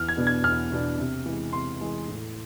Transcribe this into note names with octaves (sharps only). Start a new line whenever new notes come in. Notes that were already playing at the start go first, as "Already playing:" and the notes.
Already playing: E2 F6
G#6
B2 B3 D4
G#6
E2 F6
B2 B3 D4
C3
E3 G#3
C3 C6
E3 G#3
A2